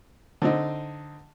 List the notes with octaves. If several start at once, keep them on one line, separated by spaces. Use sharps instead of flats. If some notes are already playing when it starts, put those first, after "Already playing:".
D3 C4 D#4